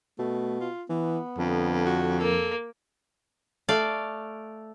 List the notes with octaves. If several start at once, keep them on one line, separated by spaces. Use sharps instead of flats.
B2 A3
F4
E3 B3
F2 D3
F#4
A#3 A4
A3 D5 F5